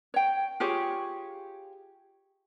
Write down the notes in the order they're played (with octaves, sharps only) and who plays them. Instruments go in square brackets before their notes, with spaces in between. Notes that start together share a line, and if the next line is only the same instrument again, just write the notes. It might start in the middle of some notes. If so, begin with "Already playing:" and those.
[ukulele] C#5 G5
F4 G4 G#4 C#5